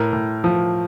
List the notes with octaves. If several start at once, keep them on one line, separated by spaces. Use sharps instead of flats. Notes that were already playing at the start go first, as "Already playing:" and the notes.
Already playing: A2 A#4
A2
F3